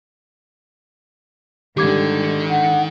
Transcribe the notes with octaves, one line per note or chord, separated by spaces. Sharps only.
G#2 D3 D#3 G3 G4 D6 G#6
F#5